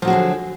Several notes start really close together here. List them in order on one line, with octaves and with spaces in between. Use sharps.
F3 F#3 F#4 G#4 D3